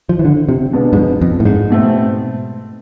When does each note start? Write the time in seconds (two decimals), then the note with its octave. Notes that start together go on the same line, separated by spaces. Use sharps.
0.09 F3
0.19 E3
0.25 D3
0.49 C3
0.73 B2 G#3 B3 D4
0.93 G#2
0.97 F2
1.22 F2
1.40 A2
1.45 G#2
1.70 B2 A3 C4